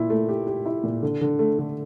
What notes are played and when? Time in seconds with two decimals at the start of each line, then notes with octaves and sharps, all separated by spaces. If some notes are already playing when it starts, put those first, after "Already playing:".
Already playing: A#2 E4
0.10 A3
0.29 G4
0.47 G4
0.66 E4
0.84 A#2
1.02 D3
1.21 D3
1.39 A3
1.59 D3